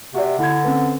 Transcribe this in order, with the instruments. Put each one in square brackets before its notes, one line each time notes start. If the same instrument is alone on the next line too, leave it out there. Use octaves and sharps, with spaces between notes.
[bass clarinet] C3 [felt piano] F#4 D5
[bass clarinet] D3 [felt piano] E4 G#6
[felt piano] C4 C#4 B4